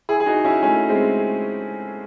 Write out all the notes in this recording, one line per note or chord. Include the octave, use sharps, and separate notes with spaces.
E4 G#4
G#4
D#4 F#4
C#4 E4
A3 C#4
G#3 C4